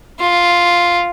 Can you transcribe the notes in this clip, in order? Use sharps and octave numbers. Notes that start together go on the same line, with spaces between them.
F4